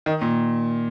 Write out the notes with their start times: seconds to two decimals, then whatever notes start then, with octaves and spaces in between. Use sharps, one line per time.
0.06 D#3
0.22 A#2